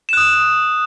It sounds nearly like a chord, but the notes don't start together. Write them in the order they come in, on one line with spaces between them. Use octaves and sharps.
E7 F#6 D#6